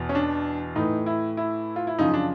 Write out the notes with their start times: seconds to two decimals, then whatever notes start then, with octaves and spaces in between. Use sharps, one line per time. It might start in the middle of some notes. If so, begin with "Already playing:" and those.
Already playing: E2 B2
0.09 C#4
0.15 D4
0.76 A2 E3 D#4
1.06 E4
1.37 E4
1.76 F4
1.87 E4
1.98 F#2 C#3 F3 D#4
2.14 D4